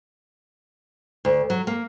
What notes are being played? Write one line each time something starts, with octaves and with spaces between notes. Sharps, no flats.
D2
F#3
A#3